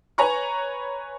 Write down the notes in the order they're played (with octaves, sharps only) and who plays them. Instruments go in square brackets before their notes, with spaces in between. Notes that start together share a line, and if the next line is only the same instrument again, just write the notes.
[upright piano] B4 C#5 G#5 A#5 B5 C#6